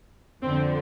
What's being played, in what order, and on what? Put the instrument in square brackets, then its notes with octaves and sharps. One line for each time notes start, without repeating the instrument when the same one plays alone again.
[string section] F2 D3 C4